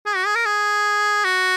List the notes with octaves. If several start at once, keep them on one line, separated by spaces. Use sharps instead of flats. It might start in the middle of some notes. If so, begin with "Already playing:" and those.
G#4
F#4
G#4
A#4
G#4
F#4